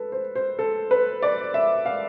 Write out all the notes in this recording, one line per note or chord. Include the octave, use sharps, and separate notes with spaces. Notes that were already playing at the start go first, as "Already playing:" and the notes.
Already playing: A4 B4
C5
C5
A4
B4
D5
E5
F5